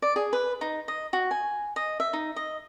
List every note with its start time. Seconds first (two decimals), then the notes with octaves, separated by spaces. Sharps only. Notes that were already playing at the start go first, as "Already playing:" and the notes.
0.02 D5
0.16 G#4
0.33 B4
0.61 D#4
0.88 D#5
1.13 F#4
1.31 G#5
1.76 D#5
2.00 E5
2.13 D#4
2.36 D#5